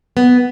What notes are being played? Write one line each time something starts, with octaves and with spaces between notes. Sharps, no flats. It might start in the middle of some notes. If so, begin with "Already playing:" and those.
B3